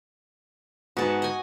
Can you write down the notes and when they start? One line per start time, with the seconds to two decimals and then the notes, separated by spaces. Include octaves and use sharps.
0.97 G#2 B3 F#4 A5
1.22 D#5 G#5